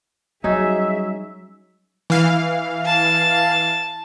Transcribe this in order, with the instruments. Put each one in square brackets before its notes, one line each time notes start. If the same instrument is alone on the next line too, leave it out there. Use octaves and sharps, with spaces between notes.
[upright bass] F#3 G3 [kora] C#4 D#4 [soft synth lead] F#4 [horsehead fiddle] G#4 E5
[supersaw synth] E3 F5
[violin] A5